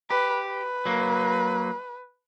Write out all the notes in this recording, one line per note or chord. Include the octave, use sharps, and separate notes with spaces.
G4 B4
B4
F#3 A#3